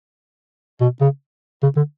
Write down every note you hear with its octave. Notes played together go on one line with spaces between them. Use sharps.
B2
C#3
C#3
D3